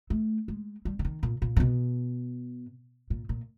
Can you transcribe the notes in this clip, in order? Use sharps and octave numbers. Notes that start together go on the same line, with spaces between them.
A3
G#3
G3
D3
D#3
A#2
A#2
C3
B2
A#2
A#2